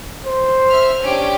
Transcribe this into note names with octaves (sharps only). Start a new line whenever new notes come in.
C5
E5 F6
C#4 D4 G4